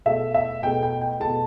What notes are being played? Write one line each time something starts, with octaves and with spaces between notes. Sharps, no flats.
B2 A3 E5
E5
B2 A3 G5
G5
G5
B2 A3 A5